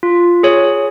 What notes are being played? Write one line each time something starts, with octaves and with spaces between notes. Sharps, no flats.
F4
G#4 C#5